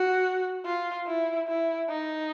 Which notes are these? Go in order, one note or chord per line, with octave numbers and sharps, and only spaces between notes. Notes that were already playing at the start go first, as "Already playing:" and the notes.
Already playing: F#4
F4
E4
E4
D#4